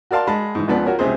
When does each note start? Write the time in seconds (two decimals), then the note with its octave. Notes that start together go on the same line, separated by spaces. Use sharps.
0.11 F#4 A#4 D5 F5 A5 C6
0.27 G#3 A5 B5
0.55 G#2 E3
0.67 G#1 C#2 F3 B3 D5
0.85 F4 F#4 A#4 C#5
0.99 C#2 C3 G#4 C5